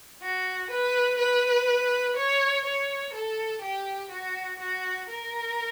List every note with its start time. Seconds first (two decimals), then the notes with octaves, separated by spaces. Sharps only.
0.22 F#4
0.70 B4
1.19 B4
2.17 C#5
2.65 C#5
3.14 A4
3.62 G4
4.11 F#4
4.59 F#4
5.09 A#4